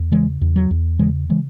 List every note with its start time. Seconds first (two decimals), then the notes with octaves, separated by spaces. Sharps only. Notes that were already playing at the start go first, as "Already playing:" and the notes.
Already playing: E2
0.11 C#3 E3 G#3
0.41 E2
0.56 F#3
0.71 E2
0.99 C#3 E3 G#3
1.29 C#3 E3 G#3